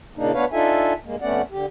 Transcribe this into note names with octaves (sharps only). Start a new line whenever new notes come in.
A#2 C#3 A#3 D4 D#4
D2 B3 D4 B4 C#5 F5
D4 D#4 F4 A4 E5 G#5
G2 G#3 A#3
F2 A3 B3 C#4 D5 F#5
D3 G4